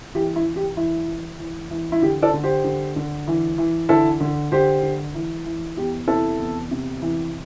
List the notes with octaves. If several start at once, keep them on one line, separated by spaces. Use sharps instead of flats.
E3 G4
E4
E3
G4
E3 E4
E3
E3
E3
E4
D3 G4
A4 D5
D3
G4 C5
D3
D3
E3
E3
D3 E4 A4
D3
D3 G4 C5
D3
E3
E3
E2 G4
C3 E4 A4
E2
C3
E3